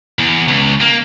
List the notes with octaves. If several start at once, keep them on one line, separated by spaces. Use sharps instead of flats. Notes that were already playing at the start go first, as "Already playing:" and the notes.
E2
C#2
A#3